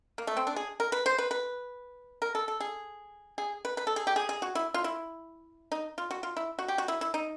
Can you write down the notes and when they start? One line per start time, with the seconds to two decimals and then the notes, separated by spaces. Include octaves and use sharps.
0.18 A#3
0.27 A3
0.37 C4
0.47 D4
0.56 G#4
0.80 A#4
0.92 B4
1.06 C5
1.18 B4
1.31 B4
2.22 A#4
2.35 A4
2.48 A4
2.60 G#4
3.38 G#4
3.65 B4
3.77 B4
3.87 A4
3.96 G#4
4.07 G4
4.16 G#4
4.29 G#4
4.42 F#4
4.55 E4
4.74 F4
4.84 E4
5.72 D#4
5.98 F4
6.11 F#4
6.23 F4
6.37 E4
6.59 F#4
6.68 G4
6.78 F#4
6.88 E4
7.01 E4
7.14 D#4